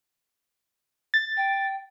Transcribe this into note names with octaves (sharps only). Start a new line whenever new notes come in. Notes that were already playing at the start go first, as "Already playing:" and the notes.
A6
G5